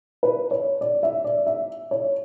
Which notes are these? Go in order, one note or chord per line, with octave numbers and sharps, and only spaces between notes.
B4
C#5
D5
E5
D5
E5
C#5